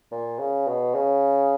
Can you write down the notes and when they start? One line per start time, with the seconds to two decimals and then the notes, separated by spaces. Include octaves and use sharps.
0.11 A#2
0.39 C#3
0.67 B2
0.94 C#3